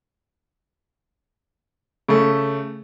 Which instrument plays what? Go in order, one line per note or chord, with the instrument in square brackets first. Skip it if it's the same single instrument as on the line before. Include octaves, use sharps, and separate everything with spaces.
[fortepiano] C#3 A3